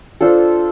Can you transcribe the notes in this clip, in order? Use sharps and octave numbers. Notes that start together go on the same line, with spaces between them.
D4 F4 A4 C5